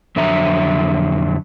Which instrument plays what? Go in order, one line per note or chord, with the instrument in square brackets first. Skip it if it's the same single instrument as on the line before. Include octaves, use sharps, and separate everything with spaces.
[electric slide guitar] F2 D3 F#3 E5 A#5